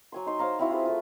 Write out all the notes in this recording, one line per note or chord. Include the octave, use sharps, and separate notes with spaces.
F#3 G#5 C6
D#4 C6
C5 C#5 F5 A#5
C4 E4 F#4
F4 G#4 B4
A3 F4